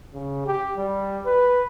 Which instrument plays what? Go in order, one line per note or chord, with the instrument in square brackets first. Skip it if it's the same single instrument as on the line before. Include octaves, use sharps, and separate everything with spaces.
[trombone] C#3
G4
G3
B4